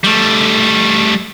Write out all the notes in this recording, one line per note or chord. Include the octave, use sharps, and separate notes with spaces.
G3 A3